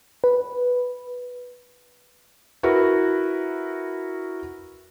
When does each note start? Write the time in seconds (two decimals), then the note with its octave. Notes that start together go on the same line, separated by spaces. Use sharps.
0.24 B4
2.63 E4 F#4 A#4 B4